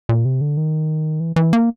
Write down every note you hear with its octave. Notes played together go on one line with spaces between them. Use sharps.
A#2
C3
D3
D#3
E3
E3
A#3